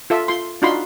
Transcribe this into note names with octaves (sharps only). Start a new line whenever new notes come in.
F4 A4 E5
F4 C6
D4 D#4 F4 F#4 B5 C6